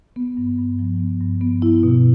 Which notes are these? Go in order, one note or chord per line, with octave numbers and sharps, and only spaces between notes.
B3
G2
G2
F3
B3
G2
B3
E4
B2